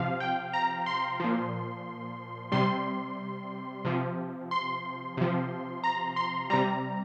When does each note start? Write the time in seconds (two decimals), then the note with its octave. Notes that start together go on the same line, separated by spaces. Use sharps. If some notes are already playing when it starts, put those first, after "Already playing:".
Already playing: C3 F3 F5
0.20 G5
0.53 A#5
0.86 C6
1.20 A#2 F3
2.52 C3 G3 C6
3.85 C3 F3
4.51 C6
5.17 C3 F3
5.84 A#5
6.16 C6
6.50 C3 G3 A#5